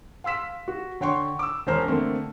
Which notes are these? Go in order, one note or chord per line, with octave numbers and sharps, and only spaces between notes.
F5 C6 E6 B6 E7
F#4
D3 C#5 F#5 G5 C6 C#6
D6 E6
E1 C#4 C5 A#5 F6
D3 A3 A#3 C4